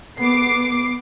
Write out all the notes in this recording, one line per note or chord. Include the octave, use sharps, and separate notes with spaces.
B3 D6 C7